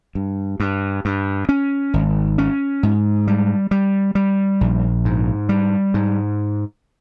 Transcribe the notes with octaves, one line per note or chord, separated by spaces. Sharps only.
G2
G2
G2
C#4
G#1
C#4
G#2
G3
G3
G3
A#1
G#2
G3
G#2